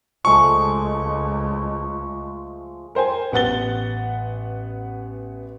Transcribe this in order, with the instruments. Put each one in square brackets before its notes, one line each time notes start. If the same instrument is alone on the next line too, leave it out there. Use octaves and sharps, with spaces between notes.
[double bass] C#2 [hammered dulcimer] F3 G#3 A3 [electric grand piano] C#6
[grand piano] A#4 C5 G5 G#5
A1 B3 F#5 A6 G7